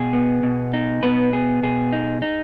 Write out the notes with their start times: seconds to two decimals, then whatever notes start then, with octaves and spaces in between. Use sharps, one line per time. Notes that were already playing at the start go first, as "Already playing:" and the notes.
Already playing: B2 G#4
0.13 B3
0.43 B2
0.73 D#4
1.03 B2 B3 B4
1.33 B3 G#4
1.63 B2 G#4
1.93 D#4
2.22 D#4